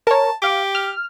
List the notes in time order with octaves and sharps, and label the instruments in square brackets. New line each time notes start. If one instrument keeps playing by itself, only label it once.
[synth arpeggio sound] A#4 C#5 [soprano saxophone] A5
[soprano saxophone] G4 [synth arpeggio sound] F5 D6
[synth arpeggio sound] F6